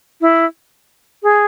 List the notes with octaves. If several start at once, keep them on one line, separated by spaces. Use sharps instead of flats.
E4
G#4